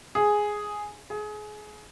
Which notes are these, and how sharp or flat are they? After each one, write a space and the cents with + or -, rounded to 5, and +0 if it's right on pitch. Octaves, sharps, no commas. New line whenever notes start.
G#4 +0
G#4 +25